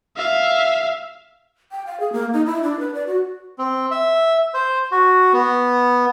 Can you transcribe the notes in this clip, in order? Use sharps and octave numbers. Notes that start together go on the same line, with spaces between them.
E5 F5
G5
F5
G#4
A#3
D#4
E4
D4
B4
D5
F#4
C4
E5
C5
F#4
B3